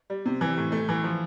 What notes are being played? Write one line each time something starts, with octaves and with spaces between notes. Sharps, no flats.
G3
C3
E3
A2
A3
E3
F3